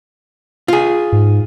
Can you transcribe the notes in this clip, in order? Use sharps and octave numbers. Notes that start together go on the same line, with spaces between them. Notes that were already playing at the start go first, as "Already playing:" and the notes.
F4 G#4
G#2